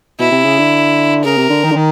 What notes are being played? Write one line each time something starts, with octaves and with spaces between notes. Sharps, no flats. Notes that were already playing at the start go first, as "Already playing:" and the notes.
B2 E4
C3
C#3
D3
C#3 A#4
C3
D3
D#3
D3
D#3